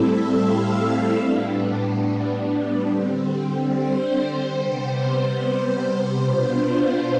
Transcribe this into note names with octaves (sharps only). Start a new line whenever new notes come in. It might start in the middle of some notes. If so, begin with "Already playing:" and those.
Already playing: A2 G3 C4 E4 A4 E5
F5
A2 G3 B3 D4
D3 G3 C4
C5
C3 G3 B3
B2 B3 D4 F4